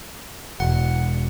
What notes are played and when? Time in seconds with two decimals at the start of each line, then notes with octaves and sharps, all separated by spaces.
0.60 E1 F#5